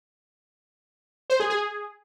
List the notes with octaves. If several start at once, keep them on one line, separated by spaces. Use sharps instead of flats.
C5
G#4
G#4